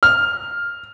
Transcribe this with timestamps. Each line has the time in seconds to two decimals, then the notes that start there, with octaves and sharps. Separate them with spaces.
0.03 F6